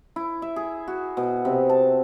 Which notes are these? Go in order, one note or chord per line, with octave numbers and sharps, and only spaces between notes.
E4
E5
G#4
F#4
B2
C3
A5